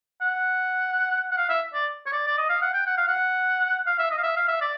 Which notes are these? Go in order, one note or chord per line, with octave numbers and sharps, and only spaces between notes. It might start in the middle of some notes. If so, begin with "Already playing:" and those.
F#5
F#5
F5
E5
D5
C#5
D5
D5
D#5
F5
F#5
G5
F#5
F5
F#5
F5
E5
D#5
F5
E5
F5
E5
D5